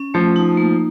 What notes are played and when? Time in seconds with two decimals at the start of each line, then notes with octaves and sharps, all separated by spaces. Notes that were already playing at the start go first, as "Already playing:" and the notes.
Already playing: C#4
0.14 F3 A3
0.36 D#4
0.57 A#3